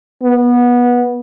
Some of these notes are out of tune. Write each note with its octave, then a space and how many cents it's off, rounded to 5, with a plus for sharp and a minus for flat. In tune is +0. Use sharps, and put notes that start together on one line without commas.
B3 -20